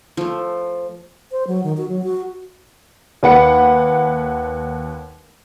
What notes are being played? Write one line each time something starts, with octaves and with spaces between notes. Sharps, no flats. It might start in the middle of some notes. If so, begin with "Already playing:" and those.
F3 A3
C5
F#3
D#3
F#4
F#3
F#4
D#2 B4 F#5 C#7